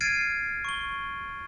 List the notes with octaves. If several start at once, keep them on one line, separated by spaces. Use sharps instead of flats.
F6 G#6 A6 C7 D7 D#7
C#6 G7